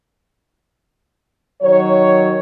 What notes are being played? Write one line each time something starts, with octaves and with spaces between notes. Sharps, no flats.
D#3 F#3 C#5